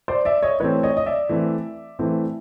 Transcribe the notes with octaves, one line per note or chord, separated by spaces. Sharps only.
C5 D5
D5 E5
C#5 D#5
E3 A3 C4 B4 C#5
C#5 D#5
D#5
D5 E5
E3 A3 C4
E3 A3 C4